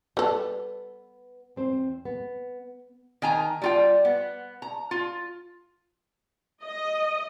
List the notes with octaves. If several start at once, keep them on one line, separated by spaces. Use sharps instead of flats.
G3 B3 A4 B4
E2 C4 C5
B3
D#3 G#5 A#5
G3 F4 G5
B3
A#5
F4
D#5